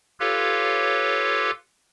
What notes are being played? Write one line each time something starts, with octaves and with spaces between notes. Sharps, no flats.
F4 G4 A4 B4 C#5 F5